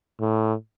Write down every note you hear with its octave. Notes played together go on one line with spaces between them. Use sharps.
A2